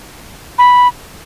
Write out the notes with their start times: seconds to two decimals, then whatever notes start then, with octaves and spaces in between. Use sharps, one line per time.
0.58 B5